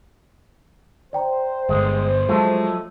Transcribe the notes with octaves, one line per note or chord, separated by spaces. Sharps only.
C5 D5 G5 A#5
G1 G#3
F3 F#3 G#3 A3 F4 A5